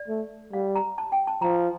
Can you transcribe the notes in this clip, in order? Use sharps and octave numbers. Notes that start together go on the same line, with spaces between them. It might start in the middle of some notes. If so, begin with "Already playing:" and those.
Already playing: D5
A3
G3 F5
A#5
A5
G5
A5
F3 A#5